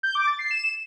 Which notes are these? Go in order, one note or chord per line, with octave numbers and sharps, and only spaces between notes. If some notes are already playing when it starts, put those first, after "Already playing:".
G6
D6
A6
C7
E7